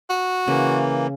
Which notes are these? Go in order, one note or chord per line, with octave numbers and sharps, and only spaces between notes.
F#4
C#3 E3 A#3